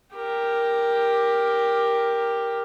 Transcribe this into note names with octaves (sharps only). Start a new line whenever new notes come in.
G4 A#4